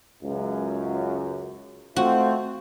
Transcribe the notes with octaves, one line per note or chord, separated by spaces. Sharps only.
C#2 F#2
A3 C4 F4 F#4